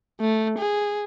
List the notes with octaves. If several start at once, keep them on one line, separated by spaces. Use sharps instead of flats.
A3
G#4